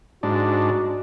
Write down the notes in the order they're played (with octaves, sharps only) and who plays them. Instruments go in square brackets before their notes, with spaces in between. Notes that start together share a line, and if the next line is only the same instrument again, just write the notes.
[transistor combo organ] G#2 D4 [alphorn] F#4